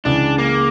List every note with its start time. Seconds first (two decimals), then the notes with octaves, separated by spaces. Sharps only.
0.05 C#2 C#3 E3 D4
0.38 A#3